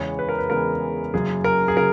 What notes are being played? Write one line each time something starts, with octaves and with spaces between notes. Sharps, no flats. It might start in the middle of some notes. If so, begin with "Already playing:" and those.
Already playing: E2 C#3 E3 G#3 B3 C#5
B4
A#4
B4
E2 C#3 E3 G#3 B3 A#4
F#1 F#2 C#3 F#3 G#4
A#4
G#4
C#3 F#3 A#4